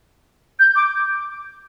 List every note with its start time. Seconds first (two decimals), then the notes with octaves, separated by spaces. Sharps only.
0.59 G6
0.76 D6